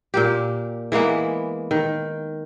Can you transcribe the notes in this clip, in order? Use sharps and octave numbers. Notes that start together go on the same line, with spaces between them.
A#2 A#3 G4
E3 G#3 A#3 B3
D#3